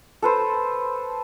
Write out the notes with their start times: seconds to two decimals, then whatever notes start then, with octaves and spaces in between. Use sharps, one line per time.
0.22 A4 B4 C5